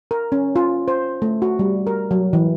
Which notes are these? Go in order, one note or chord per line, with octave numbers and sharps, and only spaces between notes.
A#4
C#4
F4
C5
A3
F#4
G3
A#4
F#3
E3